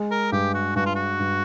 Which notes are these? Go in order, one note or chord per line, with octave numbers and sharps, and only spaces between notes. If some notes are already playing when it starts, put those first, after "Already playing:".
Already playing: G#3
A#4
G2 G4
F#4
G2 F#4
F4
F#4
G2